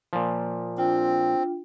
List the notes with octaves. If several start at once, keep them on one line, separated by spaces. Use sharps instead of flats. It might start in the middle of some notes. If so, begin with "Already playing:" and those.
A#2 F3
C4 D4 F4 G5